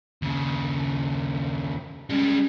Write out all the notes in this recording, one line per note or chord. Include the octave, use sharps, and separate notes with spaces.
D#2 C#3
G3 G#3 C#4